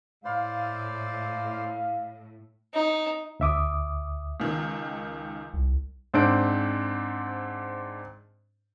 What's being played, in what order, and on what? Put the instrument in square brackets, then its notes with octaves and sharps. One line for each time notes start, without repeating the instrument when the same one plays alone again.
[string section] A2 [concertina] E4 C5 D5 [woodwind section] F5
[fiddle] D#4
[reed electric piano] D2 E5 D6 D#6
[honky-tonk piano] C#2 D#3
[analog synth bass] C2
[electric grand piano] G#2 C4 D4 C5 D7